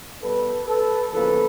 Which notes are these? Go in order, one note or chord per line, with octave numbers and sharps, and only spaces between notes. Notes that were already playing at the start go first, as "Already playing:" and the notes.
B2 G3 B3 A4 B4
A4 B4
E2 C#3 F3 A#3 A4 B4